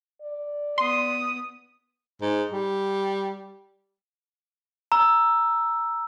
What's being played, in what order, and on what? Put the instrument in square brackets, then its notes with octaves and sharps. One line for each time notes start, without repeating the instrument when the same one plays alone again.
[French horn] D5
[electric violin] B3 D#6 [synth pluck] C6
[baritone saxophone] G#2
G3
[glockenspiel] A#5 E6